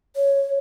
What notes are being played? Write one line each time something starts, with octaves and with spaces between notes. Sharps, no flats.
C#5